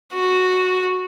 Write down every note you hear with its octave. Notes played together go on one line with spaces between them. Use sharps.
F#4